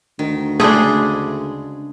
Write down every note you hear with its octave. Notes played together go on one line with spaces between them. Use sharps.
D2 D#3
C#3 G#3 A3 D4 G#4